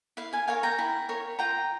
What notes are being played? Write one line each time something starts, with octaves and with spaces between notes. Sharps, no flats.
E4 F5
F5 G#5
A#4 C#5 F5 G#5
G5 A#5
E4
A#4 C#5
F4 G5 A#5